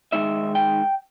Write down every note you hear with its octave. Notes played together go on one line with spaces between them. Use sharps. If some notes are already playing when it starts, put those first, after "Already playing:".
D#3 G#3 D#4 E5
G5